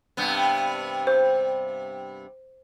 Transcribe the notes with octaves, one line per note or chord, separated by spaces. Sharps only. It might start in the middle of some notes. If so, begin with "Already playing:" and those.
G2 C3 B3
C5